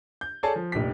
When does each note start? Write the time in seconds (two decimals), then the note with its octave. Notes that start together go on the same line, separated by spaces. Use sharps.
0.21 G6
0.43 G#4 A4 C#5 D5 G#5 A5
0.56 F3
0.72 F1 A#1 G4 B6